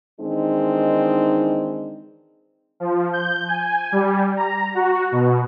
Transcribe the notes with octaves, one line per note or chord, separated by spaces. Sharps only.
D#3 E3 G#3 C4 D4 D#4
F3
G6
G#5
G3
A#5
F#4
B2